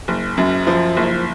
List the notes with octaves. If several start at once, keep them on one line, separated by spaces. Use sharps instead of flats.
F#1
F#2
F3
F#1